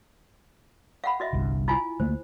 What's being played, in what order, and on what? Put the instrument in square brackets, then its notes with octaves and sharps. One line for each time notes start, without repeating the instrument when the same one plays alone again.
[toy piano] F5 F#5 B5
F#4 D#5 E5
[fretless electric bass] G1 C2 G2
[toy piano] E4 F4 G#5
[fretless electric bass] D2 A3 A#3 [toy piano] C5